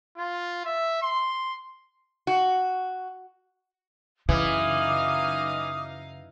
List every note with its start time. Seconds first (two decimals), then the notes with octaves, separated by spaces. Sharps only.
0.17 F4
0.65 E5
1.02 C6
2.27 F#4
4.29 F#2 C#3 E3 D#4 F5 D6 D#6 F6